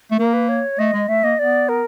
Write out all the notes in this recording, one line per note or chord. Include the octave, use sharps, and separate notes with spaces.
A3
A#3 A#4
B4
C#5
A3 D#5
G#3
A3 E5
A#3 D#5
B3 D5
A#4